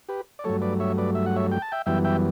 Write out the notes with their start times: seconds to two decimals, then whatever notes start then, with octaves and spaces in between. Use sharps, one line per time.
0.09 G4 B4
0.39 D5
0.44 G2 F#3 A3 A4 C#5
0.62 B4 D5
0.80 C#5 E5
0.98 B4 D5
1.15 E5
1.26 F#5
1.36 C#5 E5
1.52 G5
1.62 A5
1.72 E5 G5
1.86 F#2 E3 G3 B3 E5 G5
2.04 E5 G5